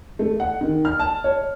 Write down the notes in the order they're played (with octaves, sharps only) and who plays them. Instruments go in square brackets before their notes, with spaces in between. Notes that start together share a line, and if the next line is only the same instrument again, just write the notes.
[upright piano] A3
F#5
D#3
F6
A5
C#5